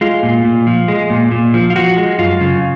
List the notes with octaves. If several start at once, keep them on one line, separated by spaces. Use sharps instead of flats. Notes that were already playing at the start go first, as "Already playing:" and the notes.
G#3 F4
A#2
A#2
F3
G#3
A#2
A#2
F3
F4
F3 F#4
G#3
F#2 F4
C#3